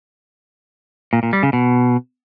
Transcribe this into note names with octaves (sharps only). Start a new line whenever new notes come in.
A#2
A#2
G3
C#3
B2